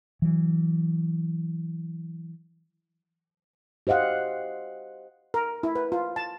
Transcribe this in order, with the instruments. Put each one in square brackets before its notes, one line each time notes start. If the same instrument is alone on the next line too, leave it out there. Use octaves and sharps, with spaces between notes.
[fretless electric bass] E3 F#3
[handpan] G4 C5 D#5 F5 F#5
[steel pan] A#4
E4
B4
F4
A5